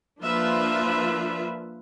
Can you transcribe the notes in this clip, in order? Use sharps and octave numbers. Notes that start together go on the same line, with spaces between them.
F3 A#3 D4 F4 B4 E5